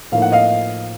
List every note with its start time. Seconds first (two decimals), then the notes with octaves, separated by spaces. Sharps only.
0.12 A2 F3 A#3 D#4 F5
0.22 F#5
0.32 D#5 F5